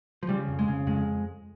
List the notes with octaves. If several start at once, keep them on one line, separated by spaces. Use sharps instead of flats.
F3
C#3 G3
F2
G#3
C#3
F2 G#3